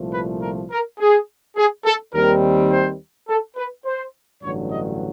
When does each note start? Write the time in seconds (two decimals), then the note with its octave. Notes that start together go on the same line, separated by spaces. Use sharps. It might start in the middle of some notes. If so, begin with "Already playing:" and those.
Already playing: C2 A#2 F3 A3
0.13 B4
0.42 A#4
0.71 A#4
0.99 G#4
1.56 G#4
1.84 A4
2.13 D#2 D#3 G3 C4 A#4
2.71 C5
3.28 A4
3.56 B4
3.85 C5
4.42 A1 G2 D3 F#3 C#5
4.71 D#5